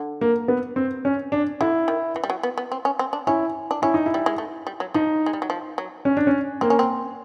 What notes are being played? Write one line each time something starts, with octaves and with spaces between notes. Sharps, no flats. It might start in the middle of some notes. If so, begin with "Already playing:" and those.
Already playing: D3
A#3
B3
C4
C#4
D4
D3 E4
D#3
E3
G3
F#3
B3
B3
C4
C#4
C4
D4
C#4 E4
D4
C#4 E4
D#4
E4
G3
G#3
A3
G3
F#3
F3 D#4
G#3
G3
F#3
F3
F#3
C#4
D4
C#4
A#3 C4
C#4
C4